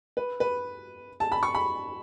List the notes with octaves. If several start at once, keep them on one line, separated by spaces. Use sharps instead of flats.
B4
B4
A5
B5
C#6
B5